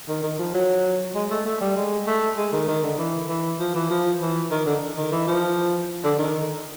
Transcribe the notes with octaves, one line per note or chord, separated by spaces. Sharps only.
D#3
D#3
F3
F#3
G#3
A3
A3
G3
G#3
A3
G#3
D#3
D#3
D3
E3
E3
F3
E3
F3
E3
D#3
D3
D#3
E3
F3
D3
D#3